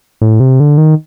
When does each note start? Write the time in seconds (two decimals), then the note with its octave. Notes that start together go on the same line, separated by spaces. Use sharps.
0.21 A2
0.40 C3
0.60 D3
0.78 D#3